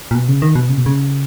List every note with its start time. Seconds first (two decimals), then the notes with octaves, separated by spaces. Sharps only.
0.11 A#2
0.15 B2
0.29 C#3
0.42 D#3
0.55 B2
0.69 C#3
0.78 B2
0.86 C#3